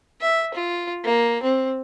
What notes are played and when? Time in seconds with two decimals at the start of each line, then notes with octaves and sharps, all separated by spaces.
0.21 E5
0.54 F4
1.04 A#3
1.43 C4